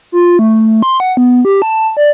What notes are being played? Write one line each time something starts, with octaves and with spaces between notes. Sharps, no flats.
F4
A3
C6
F#5
B3
G4
A5
D5